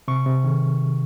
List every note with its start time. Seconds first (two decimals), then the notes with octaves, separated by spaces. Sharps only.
0.08 C3 C#6
0.26 C3
0.44 D#3